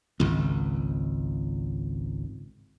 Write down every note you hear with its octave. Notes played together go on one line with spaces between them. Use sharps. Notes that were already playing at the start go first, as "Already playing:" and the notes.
G#1 C#2